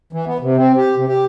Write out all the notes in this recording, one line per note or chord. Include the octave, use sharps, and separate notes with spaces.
E3
B3
C3
C4
G4
C3
G4